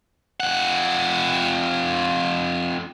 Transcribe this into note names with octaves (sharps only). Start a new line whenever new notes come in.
F2 F#5